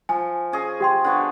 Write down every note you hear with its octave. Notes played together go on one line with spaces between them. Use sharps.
F3 G#5
C#4 G#4 D#5
G4 G5 C6
D3 B3 C#6